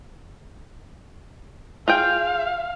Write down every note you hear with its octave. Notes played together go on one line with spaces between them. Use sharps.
F4 G#4 F5 G5